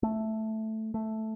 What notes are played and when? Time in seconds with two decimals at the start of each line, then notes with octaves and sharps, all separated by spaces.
0.03 A3
0.94 A3